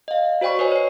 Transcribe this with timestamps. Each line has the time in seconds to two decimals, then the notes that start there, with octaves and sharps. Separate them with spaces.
0.08 D#5 F5
0.41 F#4 C5 D5 G5 B5 C#6
0.59 B4 C#5 D#5 G#5
0.72 C#5 C7